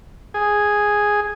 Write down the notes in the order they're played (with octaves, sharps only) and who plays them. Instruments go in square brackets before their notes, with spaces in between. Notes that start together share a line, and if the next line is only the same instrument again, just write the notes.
[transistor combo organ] G#4